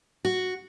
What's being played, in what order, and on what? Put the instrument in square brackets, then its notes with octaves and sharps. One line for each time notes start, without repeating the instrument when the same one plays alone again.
[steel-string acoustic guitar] F#4